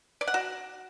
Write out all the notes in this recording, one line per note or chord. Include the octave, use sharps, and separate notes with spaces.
D5
F#5
F#4